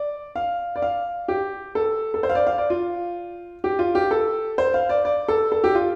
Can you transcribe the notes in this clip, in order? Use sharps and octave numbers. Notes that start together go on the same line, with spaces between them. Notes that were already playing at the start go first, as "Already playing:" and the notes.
Already playing: D5
F5
D5
F5
G4
A4
A4
C5
F5
D5
F5
D5
F4
G4
F4
G4
A4
C5
F5
D5
D5
A4
A4
G4
F4